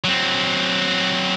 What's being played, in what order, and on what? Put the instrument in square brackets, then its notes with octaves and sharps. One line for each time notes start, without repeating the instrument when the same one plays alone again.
[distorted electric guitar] F#3 C4